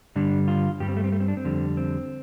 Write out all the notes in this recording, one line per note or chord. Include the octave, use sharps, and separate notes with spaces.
G2 D3 G3 D4
F4
G2 G3 G4
C4
A3
C4
A3
C4
D4
C4
F2 D3 G3
C4